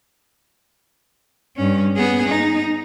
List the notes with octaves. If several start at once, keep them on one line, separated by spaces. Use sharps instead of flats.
G2 C#4
B3 G#4
D#4